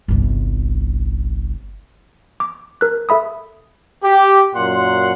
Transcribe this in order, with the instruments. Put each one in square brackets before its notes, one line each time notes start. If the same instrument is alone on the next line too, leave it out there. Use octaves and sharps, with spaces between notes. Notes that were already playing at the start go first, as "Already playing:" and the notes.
[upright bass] G1 C2
[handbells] D6
A#4 F#6
A4 E5 B5 D#6
[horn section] G4
F#2 A#2 F#5 C6